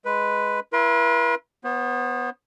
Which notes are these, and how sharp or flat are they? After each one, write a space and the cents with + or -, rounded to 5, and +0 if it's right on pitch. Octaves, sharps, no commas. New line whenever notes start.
G#3 +0 B4 +0
E4 +30 B4 -40 C6 +0
B3 +0 C5 +40